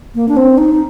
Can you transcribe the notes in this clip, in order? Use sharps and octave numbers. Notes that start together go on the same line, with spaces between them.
A#3
D4
C4
D#4